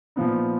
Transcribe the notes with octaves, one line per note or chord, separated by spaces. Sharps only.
A#2 F3 B3 D#4